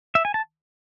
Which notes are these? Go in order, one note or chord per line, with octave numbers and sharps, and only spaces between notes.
E5
G#5
A5